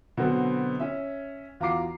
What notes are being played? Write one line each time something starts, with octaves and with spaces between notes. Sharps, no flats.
B2 D3 F#3 B3 C4
C#4 E5
E2 F4 F#4 A#5 D6 C7